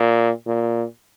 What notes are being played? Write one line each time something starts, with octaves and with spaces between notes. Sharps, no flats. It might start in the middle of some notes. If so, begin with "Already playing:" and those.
Already playing: A#2
A#2